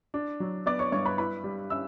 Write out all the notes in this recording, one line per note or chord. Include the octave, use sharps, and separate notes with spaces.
D4
F#3
B3 D5 D6
C#5 C#6
G2 C#5 C#6
B4 B5
E4 B4 B5
G3
C#4 E5 E6